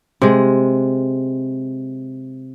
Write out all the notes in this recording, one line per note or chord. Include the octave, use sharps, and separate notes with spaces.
C3 G#3